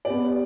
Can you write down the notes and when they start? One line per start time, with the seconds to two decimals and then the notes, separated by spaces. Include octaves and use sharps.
0.05 D5
0.07 G4
0.10 B3